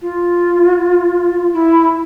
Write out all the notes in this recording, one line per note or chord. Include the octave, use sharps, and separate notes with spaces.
F4
E4